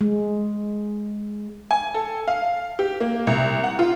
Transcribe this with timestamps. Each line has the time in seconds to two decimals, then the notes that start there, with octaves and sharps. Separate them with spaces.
0.01 G#3
1.71 G#5
1.94 A4
2.28 F5
2.79 G4
3.00 A#3
3.27 C2
3.64 F#5
3.79 F4